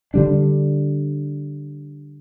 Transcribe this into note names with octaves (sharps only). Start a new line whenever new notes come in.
D3 G3 D4